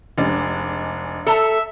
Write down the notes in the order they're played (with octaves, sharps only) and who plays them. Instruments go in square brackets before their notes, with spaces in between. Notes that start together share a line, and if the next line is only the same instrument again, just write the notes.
[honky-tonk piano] F1 G#3 D4
[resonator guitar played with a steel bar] A4 A#5 [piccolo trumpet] E5